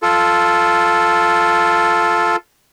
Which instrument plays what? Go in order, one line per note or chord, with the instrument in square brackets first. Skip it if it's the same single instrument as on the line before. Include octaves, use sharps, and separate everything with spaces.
[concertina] F4 A4